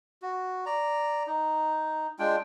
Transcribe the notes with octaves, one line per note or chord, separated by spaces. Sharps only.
F#4
D5 A#5
D#4
G#3 D4 F4 G5